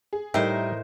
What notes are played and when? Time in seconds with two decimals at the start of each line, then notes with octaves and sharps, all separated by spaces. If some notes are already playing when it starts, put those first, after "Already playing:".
0.13 G#4
0.34 A2 G3 D#4 A#4 C5 D#5 E5 G5